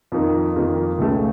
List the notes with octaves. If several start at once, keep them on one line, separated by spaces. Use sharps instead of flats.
F2 D#3 A#3 D#4
F2 D#3 A#3 D#4
C#2 C#3 A3